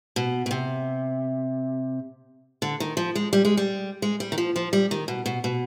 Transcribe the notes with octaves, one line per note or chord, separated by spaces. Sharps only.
B2
B2
C3
D3
D#3
F3
G#3
G3
G#3
G3
G#3
G3
D#3
F3
F3
G3
D#3
B2
B2
B2